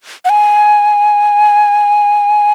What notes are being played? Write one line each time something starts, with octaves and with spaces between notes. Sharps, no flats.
F#5
G#5